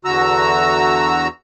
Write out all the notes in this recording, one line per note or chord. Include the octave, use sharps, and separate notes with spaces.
E2 D3 F#4 A#5 E6